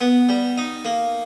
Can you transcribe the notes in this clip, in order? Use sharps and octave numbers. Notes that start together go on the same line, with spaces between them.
B3
G3
D#4
A#3